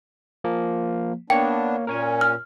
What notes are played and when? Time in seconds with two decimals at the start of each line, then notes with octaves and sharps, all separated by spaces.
0.44 F3 A#3
1.30 A#3 B3 D4 C#5 G5
1.87 A#2 C#4 A#4 C#5 G#5
2.21 F6